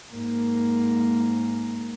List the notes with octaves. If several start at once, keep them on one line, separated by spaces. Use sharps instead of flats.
G#2 A#3